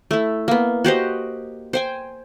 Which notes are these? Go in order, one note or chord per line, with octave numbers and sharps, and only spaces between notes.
A3 E4
A#3 B3
F#4 G4 C5 D#5
C5 G5 G#5